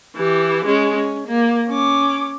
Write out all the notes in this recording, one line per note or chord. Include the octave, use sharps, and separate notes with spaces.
E3 G4
G#3 C#4
C#4
A#3
C#4 D6